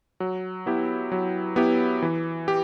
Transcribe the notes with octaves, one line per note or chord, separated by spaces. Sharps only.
F#3
B3 E4 G4
F#3
B3 E4 G4
E3
G4